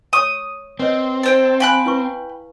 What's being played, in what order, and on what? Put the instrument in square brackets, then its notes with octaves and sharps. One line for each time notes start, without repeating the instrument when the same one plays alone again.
[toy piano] C#5 C#6 E6 [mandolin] D#6
[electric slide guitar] C4 [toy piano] B4 C#5 D#5
[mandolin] A4 C5 G5
[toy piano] F5 G#5 [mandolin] G5 B5 F#6
[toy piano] E4 B4 C#6